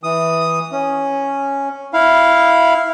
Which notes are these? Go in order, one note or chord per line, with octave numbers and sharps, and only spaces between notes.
E3 D#6
C#4
E4 F5